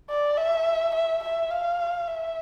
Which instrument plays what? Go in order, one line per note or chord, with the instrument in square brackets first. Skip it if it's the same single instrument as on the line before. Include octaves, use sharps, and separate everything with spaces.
[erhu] D5
E5
E5
E5
F5
E5